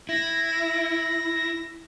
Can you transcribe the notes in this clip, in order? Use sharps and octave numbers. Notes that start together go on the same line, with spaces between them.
E4 A#6